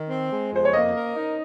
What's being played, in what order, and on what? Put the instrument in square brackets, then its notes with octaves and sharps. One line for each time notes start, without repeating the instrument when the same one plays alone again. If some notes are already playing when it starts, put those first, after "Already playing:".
Already playing: [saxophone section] D#3
C4
G#3
[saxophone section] F2 [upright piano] C5
[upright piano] C#5
[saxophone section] A#3 [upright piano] D#5
[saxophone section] A#4
D#4